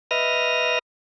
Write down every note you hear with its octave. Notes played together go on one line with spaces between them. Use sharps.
B4 D#5 E5 D#6 F6 A#6